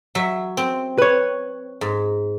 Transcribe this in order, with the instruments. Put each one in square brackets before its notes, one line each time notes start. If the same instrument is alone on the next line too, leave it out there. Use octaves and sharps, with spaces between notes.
[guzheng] F#3 E5
C4
[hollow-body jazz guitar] B4 C#5
[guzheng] G#2